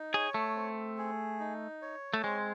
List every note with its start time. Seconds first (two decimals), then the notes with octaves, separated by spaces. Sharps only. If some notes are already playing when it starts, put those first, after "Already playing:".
Already playing: D#4
0.13 G#4 C#5
0.34 A3
0.55 C4
0.98 G#4
1.40 D#4
1.82 C#5
2.14 A3
2.24 G#3 C4